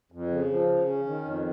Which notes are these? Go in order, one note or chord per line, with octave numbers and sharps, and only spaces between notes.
F2
C#3
F3
C#3
C#4
D#3
F2